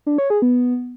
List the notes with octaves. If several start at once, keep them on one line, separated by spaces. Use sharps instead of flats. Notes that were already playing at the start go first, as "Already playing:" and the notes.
D4
C#5
G#4
B3